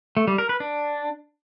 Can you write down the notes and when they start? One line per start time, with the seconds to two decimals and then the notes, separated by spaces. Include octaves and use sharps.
0.17 A3
0.27 G3
0.38 A#4
0.49 B4
0.60 D4